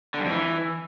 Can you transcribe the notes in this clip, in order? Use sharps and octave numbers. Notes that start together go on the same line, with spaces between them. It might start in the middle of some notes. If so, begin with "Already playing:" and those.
D3
G2
F2
E3